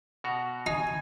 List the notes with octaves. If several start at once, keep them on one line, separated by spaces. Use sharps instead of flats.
B2 F#4 A#5
D#4 G#5